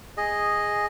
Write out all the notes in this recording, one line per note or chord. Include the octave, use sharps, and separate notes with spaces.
G#4 D#5